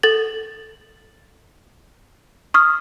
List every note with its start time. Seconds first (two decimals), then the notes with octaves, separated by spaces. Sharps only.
0.03 A4 A6 F#7
2.54 C#6 D#6 F6